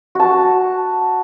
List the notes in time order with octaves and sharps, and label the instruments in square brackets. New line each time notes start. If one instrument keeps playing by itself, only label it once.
[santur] F#4 A5